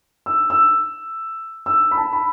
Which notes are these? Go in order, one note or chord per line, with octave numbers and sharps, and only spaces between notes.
E6
E6
E6
B5
A5
B5